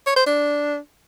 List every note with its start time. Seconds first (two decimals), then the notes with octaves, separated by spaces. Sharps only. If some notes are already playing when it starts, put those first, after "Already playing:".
0.07 C#5
0.16 C5
0.26 D4